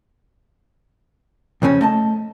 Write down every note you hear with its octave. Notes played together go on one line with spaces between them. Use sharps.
F2 C#3 C4 C#4
A3 D#5 A5